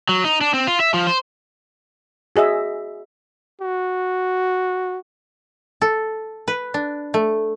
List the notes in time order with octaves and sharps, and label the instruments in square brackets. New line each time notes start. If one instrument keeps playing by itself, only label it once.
[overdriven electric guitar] F#3
D#4
D4
C4
F4
E5
F3
C5
[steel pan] F#4 G#4 D#5 E5
[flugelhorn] F#4
[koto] A4
B4
D4
A3